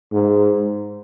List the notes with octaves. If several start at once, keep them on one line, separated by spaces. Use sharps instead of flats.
G#2